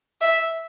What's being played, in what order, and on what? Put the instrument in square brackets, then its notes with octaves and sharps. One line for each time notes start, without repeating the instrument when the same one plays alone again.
[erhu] E5